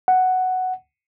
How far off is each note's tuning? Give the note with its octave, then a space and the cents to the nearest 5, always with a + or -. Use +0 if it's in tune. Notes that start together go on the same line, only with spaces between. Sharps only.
F#5 +5